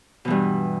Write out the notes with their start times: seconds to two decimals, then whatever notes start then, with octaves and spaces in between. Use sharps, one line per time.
0.25 B2
0.28 E3
0.30 G2